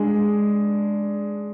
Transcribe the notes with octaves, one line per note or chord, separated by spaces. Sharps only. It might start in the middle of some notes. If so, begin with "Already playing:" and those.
Already playing: G#3 D4 G#4